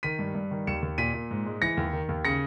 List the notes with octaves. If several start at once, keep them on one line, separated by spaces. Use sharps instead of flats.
D#3 B6 D#7
G2
G2
D#3
D#2 C#7 E7
D#2
A#2 B6 D#7
A#2
G#2
G#3
E3 A#6 C#7
D#2
D#3
D#2
C#3 A#6 C#7